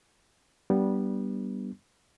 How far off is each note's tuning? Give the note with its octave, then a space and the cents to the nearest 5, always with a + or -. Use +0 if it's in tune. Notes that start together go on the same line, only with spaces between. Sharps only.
G3 -15 B3 -20 D4 +0